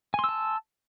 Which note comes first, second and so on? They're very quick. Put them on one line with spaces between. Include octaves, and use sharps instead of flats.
G#5 C6 E6 A5